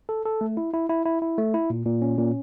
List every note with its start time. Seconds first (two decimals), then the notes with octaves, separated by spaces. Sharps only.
0.09 A4
0.25 A4
0.41 A3
0.57 E4
0.73 E4
0.89 E4
1.06 E4
1.22 E4
1.38 A3
1.54 E4
1.70 A#2
1.86 A#2
2.02 C#4
2.18 A#2